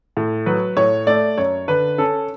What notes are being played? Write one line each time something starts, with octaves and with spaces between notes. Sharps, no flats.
A2
F#3 B4
A2 C#5
A3 D5
F#2 C#5
D3 B4
C#4 A4